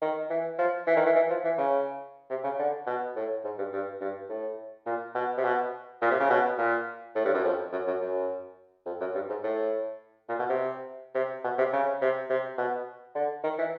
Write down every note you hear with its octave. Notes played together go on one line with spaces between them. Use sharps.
D#3
E3
F3
E3
D#3
E3
E3
F3
E3
C#3
C3
C#3
D3
B2
A2
G#2
G2
G2
G2
A2
A#2
B2
C3
B2
A#2
C3
C#3
B2
A#2
A2
G2
F#2
F2
F#2
F#2
F#2
F2
F#2
G2
G#2
A2
A#2
B2
C3
C3
B2
C3
C#3
C3
C3
B2
D3
D#3
E3